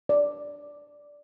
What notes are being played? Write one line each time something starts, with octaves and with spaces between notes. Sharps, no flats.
D5